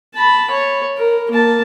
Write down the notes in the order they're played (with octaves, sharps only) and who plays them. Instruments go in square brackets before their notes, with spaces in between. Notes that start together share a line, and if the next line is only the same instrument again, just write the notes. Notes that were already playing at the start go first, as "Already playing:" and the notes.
[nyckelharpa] A5 B5
C#5
A#4
A#3 A5